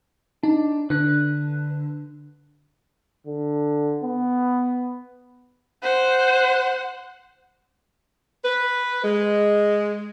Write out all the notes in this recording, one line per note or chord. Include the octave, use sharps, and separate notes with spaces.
D4 D#4
D3 D4 B4 F#6
D3
B3
C5 F#5
B4
G#3